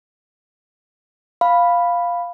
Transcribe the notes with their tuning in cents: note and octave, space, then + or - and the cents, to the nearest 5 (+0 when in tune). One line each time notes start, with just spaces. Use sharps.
F5 +0 B5 +0